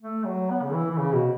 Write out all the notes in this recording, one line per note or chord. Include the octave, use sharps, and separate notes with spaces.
A3
F#3
B3
C#3
E3
E3
C#3
B2